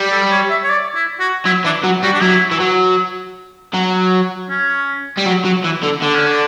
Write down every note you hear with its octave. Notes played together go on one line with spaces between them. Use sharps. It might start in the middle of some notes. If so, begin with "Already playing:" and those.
Already playing: G3
A4
C#5
E5
C#5
D5
E4
F#4
F#3 E4
E3 D4
F#3
G3 F#4
D4
F#3 E4
E3
F#3
F#3
C#4
G3
F#3
F#3
E3
D3
D3 D4
C#4
D4